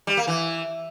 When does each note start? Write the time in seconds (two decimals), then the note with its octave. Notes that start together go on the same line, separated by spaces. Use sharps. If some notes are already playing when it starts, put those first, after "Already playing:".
0.07 G3
0.17 A#3
0.27 E3